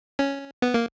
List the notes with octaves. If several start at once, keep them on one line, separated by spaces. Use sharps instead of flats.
C#4
B3
A#3